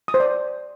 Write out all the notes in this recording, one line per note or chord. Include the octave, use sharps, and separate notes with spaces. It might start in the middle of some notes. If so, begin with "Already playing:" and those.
D#6
C5
D5